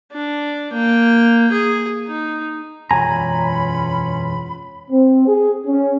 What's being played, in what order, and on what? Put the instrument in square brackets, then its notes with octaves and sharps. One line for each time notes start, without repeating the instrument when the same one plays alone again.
[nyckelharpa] D4
A#3 G5
G#4
D#4
[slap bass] E1 F#2 [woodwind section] C#4 F4 B5 [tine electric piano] G#5 [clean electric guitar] A#5
[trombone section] C4
G#4
C#4